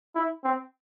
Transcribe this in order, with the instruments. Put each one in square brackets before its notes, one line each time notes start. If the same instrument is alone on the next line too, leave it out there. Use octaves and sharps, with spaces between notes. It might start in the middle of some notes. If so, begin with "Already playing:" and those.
[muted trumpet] E4
C4